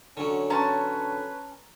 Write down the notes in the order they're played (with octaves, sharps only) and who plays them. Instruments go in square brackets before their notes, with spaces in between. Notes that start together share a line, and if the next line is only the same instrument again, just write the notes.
[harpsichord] D3 F#3 [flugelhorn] C#4
[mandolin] C#4 A5 [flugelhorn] B4 [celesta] A#5 C6 C#6